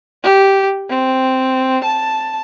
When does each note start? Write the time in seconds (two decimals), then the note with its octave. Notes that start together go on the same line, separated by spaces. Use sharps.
0.24 G4
0.90 C4
1.84 A5